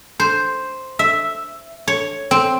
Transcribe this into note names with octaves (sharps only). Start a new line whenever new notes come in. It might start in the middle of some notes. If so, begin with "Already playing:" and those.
C5
E5
C#5
C4